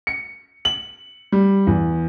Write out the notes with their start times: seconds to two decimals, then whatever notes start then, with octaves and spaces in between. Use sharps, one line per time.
0.07 C#7
0.65 F#7
1.32 G3
1.67 E2